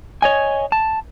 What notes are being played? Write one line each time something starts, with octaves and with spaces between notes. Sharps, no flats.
C#5 D#5 G#5
A5